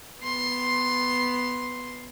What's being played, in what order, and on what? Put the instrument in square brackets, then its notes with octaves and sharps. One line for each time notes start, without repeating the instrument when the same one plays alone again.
[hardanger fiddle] B3 C6